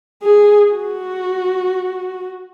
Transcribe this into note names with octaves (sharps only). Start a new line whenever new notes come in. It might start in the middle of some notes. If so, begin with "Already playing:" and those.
G#4
F#4